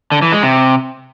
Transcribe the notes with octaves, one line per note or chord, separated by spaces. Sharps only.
D3
E3
G#3
C3